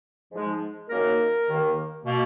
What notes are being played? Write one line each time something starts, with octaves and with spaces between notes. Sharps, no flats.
G#2 F3 G#3
F#2 D#3 A#3 A#4
D#2 D#3 A#3
B2 A#3